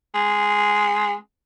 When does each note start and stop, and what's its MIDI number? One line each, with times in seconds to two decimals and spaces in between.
0.15 1.15 56